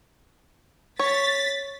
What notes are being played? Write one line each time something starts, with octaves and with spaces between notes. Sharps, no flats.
C#5 A6 B6